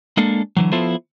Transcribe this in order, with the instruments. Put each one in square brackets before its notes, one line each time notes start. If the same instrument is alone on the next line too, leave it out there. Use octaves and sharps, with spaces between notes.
[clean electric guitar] G#3 A#3 D4 A4
D3 E3 F#3
F3 B3 E4 F4 A4 C5